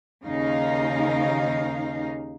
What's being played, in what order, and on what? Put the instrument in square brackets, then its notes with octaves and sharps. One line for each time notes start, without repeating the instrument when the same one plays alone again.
[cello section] D#2 C#3 D#4 F5